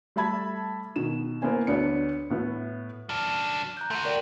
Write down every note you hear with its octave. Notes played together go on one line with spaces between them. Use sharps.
G3 A3 E5 A5 B5 G#6
B2 D#3 E7
A#3 B3 E4 C5 G#5
D2 B3 D4 C#5 D5 C#7
A2 B3 E4
F#3 D4 F6
A#5 F#6 G6
A3 F#4 C6
A#4 D5 G5